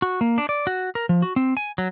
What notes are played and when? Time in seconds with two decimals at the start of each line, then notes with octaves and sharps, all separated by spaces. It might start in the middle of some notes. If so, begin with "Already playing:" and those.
0.02 F#4
0.21 A#3
0.38 D4
0.49 D5
0.67 F#4
0.95 A#4
1.09 F3
1.22 F#4
1.36 C4
1.57 G#5
1.78 F#3